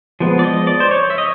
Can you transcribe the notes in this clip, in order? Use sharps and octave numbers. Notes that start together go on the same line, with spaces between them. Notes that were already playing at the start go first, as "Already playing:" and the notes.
F3 G#3 B3
D5
D#5
D5
C5
C#5
E5
D#5